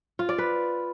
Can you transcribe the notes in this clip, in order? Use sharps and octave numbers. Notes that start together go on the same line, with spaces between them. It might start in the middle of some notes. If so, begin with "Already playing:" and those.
F4
D5
B4